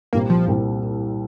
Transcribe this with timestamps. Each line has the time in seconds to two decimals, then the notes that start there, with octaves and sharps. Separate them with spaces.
0.13 C2 A#2 G3 A#3 C4
0.30 F3
0.48 C2 A#2 G3 C4